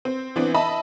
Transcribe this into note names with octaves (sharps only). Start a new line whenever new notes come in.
C4
E3 B3 C4 D4
D#5 E5 A5 B5